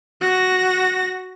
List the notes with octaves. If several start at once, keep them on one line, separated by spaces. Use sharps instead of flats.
F#4 A#6